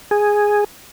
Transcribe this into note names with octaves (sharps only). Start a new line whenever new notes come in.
G#4